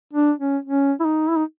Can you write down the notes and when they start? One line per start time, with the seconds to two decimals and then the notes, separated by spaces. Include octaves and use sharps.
0.13 D4
0.39 C#4
0.65 C#4
1.00 E4
1.05 D#4
1.29 E4
1.37 D#4